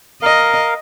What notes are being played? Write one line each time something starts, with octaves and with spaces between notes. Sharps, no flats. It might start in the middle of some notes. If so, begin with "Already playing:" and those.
A#4 D#5 F5